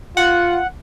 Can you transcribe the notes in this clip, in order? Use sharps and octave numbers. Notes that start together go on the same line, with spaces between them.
F4 F#5